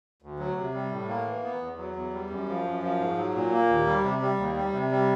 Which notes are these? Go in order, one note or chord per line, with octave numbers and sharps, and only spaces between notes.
D2
F#3
C3
G3
A2
A#3
E3
B3
E2
F#3
E2
G3
F#2
F3
F#2
F3
G#2
F#3
A#2
A#3
D#2
G3
C3
G3
D#2
G3
C3
G3